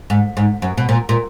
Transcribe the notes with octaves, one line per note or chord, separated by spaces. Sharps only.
G#2
G#2
F#2
B2
A#2
A#2